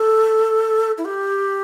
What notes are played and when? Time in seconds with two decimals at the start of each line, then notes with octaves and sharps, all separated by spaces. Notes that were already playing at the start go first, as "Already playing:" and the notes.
Already playing: A4
0.98 E4
1.05 G4